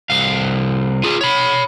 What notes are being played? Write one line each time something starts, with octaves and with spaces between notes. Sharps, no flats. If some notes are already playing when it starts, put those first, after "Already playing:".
C2 F5
F4 G#4
C#5 B5